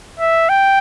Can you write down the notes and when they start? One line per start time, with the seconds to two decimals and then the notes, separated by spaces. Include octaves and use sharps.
0.20 E5
0.49 G5